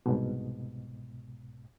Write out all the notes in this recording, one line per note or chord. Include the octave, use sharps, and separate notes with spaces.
C2 G#2 B2